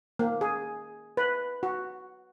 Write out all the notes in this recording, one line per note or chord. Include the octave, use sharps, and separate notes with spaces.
A#3
G#4
B4
F#4